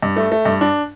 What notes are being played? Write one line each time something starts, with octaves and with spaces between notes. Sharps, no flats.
G2
A3
A3
G2
D4